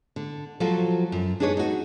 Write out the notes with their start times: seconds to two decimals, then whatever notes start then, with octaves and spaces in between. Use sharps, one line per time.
0.16 D3
0.60 F3 F#3 F4 F#4 A4
1.12 F#2
1.40 D4 D#4 G#4 B4 C#5
1.57 D#4 F#4